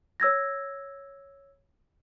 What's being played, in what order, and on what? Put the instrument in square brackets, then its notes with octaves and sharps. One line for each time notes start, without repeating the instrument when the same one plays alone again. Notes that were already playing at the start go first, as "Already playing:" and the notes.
[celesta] C#5 E6 G#6 A#6